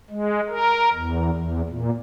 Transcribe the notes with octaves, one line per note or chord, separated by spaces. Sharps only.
G#3
A#4
E2
E2
A#2